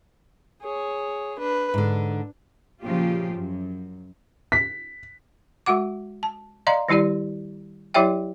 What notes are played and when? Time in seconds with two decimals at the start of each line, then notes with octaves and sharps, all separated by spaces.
0.62 G#4 C#5
1.39 D4 B4
1.74 G#2 D3 D4
2.82 A#2 C#3 F3 F4 G4
3.32 F#2
4.52 B6
5.66 G#3 F#4 F#5 D6
6.23 A5
6.67 D5 D#5 F5 A#5 C6
6.88 D#3 G3 E4 G4 D5
7.94 F#3 E4 G4 C#5 E5 G5